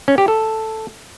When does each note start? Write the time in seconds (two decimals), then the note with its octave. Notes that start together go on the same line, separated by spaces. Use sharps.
0.08 C#4
0.18 G4
0.28 A4